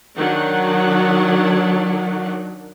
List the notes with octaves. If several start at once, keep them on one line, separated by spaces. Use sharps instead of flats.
D#3 F#3 D4 F#5